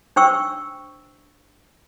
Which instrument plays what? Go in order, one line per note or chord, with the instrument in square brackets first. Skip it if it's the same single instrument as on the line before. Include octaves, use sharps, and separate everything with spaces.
[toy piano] D4 C5 G5 C#6 E6